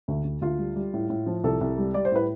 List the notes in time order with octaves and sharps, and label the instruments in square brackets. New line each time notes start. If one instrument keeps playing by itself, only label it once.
[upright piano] D2
D2
D2 F4
G3
G3
A2
A2
F3
C2 A4
C2
G3
G3 D5
C5
A2 B4